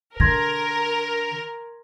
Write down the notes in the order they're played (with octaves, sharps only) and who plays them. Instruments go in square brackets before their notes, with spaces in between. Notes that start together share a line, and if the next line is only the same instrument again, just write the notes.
[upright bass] D3 [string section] A#4 [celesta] C6 G#6 A#6